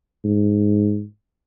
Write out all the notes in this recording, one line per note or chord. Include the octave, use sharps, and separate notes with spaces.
G#2